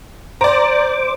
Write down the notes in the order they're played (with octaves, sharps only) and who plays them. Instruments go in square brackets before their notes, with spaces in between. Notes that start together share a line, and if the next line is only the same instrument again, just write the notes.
[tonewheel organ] C5 D6 [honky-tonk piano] D5 A#5